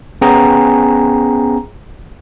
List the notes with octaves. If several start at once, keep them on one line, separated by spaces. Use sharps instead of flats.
B3 C#4 G#4 G5 G#5 A#5